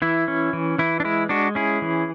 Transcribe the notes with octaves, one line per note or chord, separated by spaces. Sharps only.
E3 E4
C#4
E3
E3 E4
D4
G#3 E4
G#3 D4 F#4
C#4 E4 G#4
E3